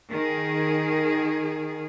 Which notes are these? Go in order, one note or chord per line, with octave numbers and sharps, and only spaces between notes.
D#3 G#4